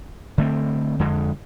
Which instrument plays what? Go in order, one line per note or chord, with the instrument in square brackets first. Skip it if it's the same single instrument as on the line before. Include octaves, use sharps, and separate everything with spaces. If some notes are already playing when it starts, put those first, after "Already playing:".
[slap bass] D3 A3 C4
F2 D3 G#3